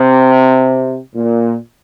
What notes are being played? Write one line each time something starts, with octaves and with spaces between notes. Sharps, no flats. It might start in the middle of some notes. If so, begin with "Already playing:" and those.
Already playing: C3
A#2